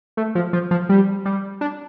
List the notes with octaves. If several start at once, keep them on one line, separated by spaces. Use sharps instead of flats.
A3
F3
F3
F3
G3
G3
D4